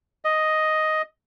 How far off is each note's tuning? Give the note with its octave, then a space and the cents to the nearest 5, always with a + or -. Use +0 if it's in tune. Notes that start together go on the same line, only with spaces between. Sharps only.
D#5 +5